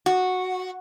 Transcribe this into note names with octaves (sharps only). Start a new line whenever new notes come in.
F#4